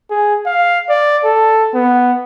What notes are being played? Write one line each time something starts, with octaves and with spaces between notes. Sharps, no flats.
G#4
F5
D5
A4
B3